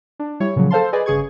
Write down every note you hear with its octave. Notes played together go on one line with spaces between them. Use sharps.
D4
G3 E4 C#5
A#2 C#3 F3 F#3
A4 C5 F5 A5 C6
G#4 B4 D5 D#5 G#5
G1 C#3 G#4 C#6 G#6